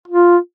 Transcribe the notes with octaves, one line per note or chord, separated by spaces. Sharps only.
F4